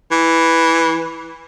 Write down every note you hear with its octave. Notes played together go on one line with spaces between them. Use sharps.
E3